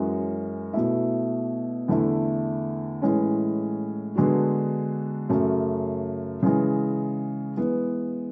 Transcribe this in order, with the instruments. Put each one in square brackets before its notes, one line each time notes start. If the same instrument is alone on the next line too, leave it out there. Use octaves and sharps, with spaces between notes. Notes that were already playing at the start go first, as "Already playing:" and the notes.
Already playing: [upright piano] F#2 E3 G#3 C#4 F#4
B2 A3 E4
E2 D3 A3 E4
A2 E3 G#3 C#4
D3 G#3 B3 D4 F#4
F#2 C#3 F#3 A3
C#3 E3 G#3
E3 G#3 B3